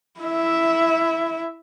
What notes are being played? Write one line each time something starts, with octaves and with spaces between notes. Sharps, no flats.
E4 E5